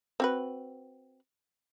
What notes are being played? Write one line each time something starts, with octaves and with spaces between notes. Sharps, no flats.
C4 F#4 B4